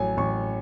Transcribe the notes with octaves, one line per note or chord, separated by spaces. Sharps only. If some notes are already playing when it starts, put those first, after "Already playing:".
Already playing: A1 F#3 G#5
A1 C#6